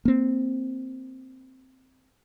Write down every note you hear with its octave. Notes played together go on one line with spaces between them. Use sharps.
A#3 C4